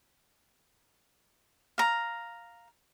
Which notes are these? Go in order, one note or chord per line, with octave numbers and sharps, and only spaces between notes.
F5 A#5